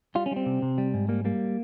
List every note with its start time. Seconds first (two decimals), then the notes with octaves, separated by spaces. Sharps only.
0.15 G3 F4
0.26 C#4
0.31 G3
0.36 C4
0.46 C3
0.62 C3
0.78 G3
0.94 G#2
1.09 G3 A#3
1.25 G3 A#3